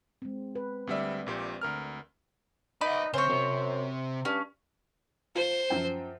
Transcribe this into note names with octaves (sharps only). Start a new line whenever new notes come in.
G#3 C4
B4
D2 G3 C4 D5 E5
A#1 A#2 G4
D2 A#4 F6
D#4 B4 D5 E5
C#3 C4 C#4 C5 C#5
F#2 C3 C4
G2 C#4
F4 C5
F#2 F3 G5